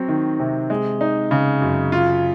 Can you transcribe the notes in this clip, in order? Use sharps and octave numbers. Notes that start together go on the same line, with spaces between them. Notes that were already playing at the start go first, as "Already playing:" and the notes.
Already playing: F#3 C4
D#3
C3
G#3
D#4
C#3
F#2
F4